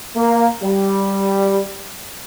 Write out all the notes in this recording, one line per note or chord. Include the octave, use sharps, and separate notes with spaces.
A#3
G3